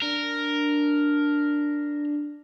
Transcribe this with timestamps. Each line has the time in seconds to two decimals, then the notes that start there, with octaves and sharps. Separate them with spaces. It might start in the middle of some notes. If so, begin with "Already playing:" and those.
0.02 D4 A#4